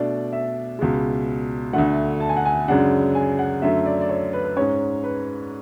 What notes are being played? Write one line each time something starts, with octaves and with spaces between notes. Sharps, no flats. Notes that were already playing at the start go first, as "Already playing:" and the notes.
Already playing: B2 A3 D4 D5
E5
C#2 B2 G#3
D2 D3 A3 F#5
A5
G#5
F#5
G#5
F#2 C#3 G#3 D4 F#5
G#5
F#5
F#2 D3 A3 E5
D5
D5
C#5
B4
B4
G#2 G#3 C#4 C#5
B4